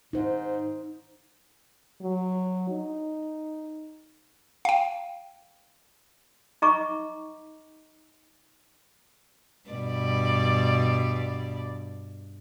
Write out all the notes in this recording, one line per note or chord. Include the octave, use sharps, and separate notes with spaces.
G#2 D#4 C5
F#3
D#4
F5 G5
D#4 D#5 A#5 C#6 D6
G2 B2 D5